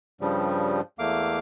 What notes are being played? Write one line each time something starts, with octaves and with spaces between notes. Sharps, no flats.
G2 C#3 F3 G3
E2 A3 A#3 F5 D6